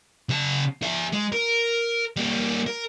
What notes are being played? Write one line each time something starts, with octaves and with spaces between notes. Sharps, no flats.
C#3 A5
G#4 E5
G#3
A#4
G3 A#3
A#4